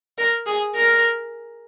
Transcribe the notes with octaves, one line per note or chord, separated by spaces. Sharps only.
A#4
G#4
A#4